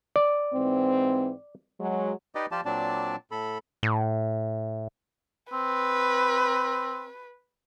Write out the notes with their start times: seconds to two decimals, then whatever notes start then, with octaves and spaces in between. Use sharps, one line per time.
0.16 D5
0.53 G#2 E3 C4
1.79 F#3 G#3
2.35 D#4 G4 B4 D5 D#5
2.52 F3 F4 G4 D5 A5
2.65 A#2 F#3 C4 D4 D5 A5
3.31 A2 A4 B5
3.83 A2
5.53 C4 B4